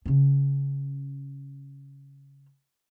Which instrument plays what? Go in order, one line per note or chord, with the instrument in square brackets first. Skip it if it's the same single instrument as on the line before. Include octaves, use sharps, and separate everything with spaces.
[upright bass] C#3 C#4